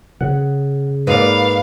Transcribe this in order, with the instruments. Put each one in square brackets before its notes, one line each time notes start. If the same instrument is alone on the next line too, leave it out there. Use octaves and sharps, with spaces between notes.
[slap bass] C#3 [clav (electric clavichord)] F#5
[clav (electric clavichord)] G#2 A#3 [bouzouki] B4 D5 [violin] F5